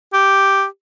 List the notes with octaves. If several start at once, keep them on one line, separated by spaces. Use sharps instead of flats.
G4